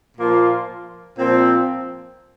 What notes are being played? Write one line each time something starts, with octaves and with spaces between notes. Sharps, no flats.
A#2 F3 A#3 F4
A#2 F3 C4